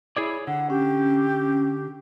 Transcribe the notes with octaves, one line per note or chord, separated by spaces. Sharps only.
E4 G#4 C#5 D5
D3 F#5
C#4 G4